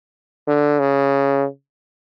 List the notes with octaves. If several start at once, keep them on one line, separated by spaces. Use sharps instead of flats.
D3
C#3